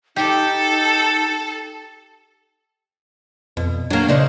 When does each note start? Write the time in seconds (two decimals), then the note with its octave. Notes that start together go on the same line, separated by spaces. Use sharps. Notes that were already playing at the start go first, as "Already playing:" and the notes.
0.16 D#4 G4 A4
3.57 F2 B2
3.90 F#3 A#3 D4
4.08 C#3 D4 D#4 C5